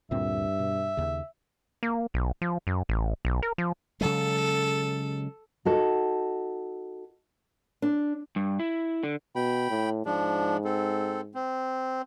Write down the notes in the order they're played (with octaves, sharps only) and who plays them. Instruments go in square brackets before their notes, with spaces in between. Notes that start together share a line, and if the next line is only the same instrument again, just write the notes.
[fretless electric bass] D2 A#2 C4 [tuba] G2 [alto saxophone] E5
[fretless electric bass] B2
D#2 C#3
[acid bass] A#3
B1
F3
F#2
A1
B1
A#4
F3
[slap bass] C#3 F#3 G#3 [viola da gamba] A4
[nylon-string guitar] D#4 F#4 A4
D4
[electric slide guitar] G2
E4
D3
[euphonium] B2 [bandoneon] G5 B5
[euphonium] A2
[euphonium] G#2 [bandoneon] F3 D4
[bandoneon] C4 A4
C4